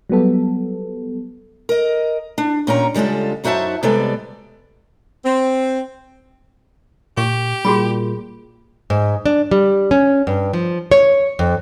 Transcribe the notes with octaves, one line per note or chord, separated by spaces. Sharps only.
F#3 G3 B3 A4
A#4 D#5
D4
A#2 C#4 G5 A#5
C#3 G3 G#3 F4 A4
F#2 D#4 F#4 C5 E5 A5
C3 G3 G#3 B3 A4 D5
C4
A#2 G4 C#6
A#2 G3 F#4 G#4 B5
G#2
D4
G3
C#4
G2
F3
C#5
F2